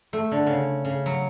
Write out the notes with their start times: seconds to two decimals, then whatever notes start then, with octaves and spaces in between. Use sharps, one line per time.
0.13 A3
0.31 D3
0.47 C#3
0.85 C#3
1.06 F#3